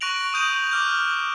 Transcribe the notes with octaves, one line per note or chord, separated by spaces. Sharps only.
C#6 F#6 A#6 D7 F7 F#7
C#6 D#6 G6 D#7 F#7
D6 F6 G6